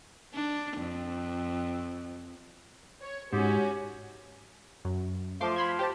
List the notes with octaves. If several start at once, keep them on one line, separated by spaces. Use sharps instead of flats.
D4
F2
C#5
G#2 C#4 F#4 G4
F#2
F3 A3 C6 D6
B5 C6 G#6
G4 C5 A5